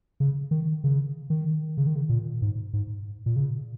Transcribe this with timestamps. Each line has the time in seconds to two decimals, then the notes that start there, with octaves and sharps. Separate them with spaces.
0.20 C#3
0.51 D#3
0.84 C#3
1.30 D#3
1.77 C#3
1.87 D#3
1.96 C#3
2.09 A#2
2.42 G#2
2.73 G#2
3.26 A#2
3.36 C#3